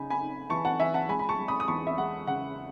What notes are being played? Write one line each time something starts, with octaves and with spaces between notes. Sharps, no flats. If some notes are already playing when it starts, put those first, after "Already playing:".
Already playing: C#3 D#4 G#5 B5
G#5 B5
D#4
E3 A5 C#6
F#5 A5
E3 E5 G#5
F#5 A5
G#3 G#5 B5
B5
A5 C#6
G#3
B5 D#6
D#6
E2 A5 C#6
E5
G#3 F#5
C#3 F#5